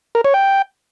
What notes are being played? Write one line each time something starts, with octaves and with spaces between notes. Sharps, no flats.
A#4
C#5
G5